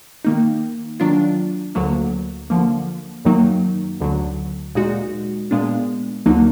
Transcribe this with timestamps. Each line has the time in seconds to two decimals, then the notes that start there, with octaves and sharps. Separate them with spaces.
0.25 D#3 A#3 D#4
1.00 D#3 F#3 D4 F4
1.75 D2 D3 F#3 A#3
2.50 D3 F3 A#3
3.25 F#2 D#3 F#3 A#3 D#4
4.01 D2 D3 F#3
4.75 A#2 G#3 D#4 F#4
5.51 A#2 G#3 B3 D4
6.26 D2 D3 F#3 A#3 D#4